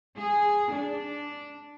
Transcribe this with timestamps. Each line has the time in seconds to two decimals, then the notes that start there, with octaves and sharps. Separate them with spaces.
0.17 G#4
0.73 D4